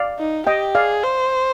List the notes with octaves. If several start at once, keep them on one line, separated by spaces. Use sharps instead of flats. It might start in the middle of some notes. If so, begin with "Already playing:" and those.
Already playing: D5 F5
D#4
G4 D#5 G5
G#4 D5 F5
C5